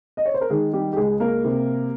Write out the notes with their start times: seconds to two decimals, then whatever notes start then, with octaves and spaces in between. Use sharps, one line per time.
0.17 D#5
0.26 C#5
0.34 C5
0.41 A#4
0.50 D#3 G#3 G#4
0.73 G3 G4
0.93 G4
0.96 C#2 G#3 G#4
1.20 A#3 A#4
1.45 C3